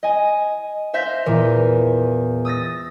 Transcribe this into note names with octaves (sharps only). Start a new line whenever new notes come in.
D#5 G#5
C5 E5 F5 G6 A#6 B6
E2 A#2 E3
D#6 E6 A6 A#6